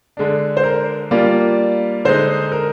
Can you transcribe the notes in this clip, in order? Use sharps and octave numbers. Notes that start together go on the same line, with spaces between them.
D3 G#3 D4
C5
A#4
G3 A#3 D4 F4 D5
D3 G#3 D#4 C5
A#4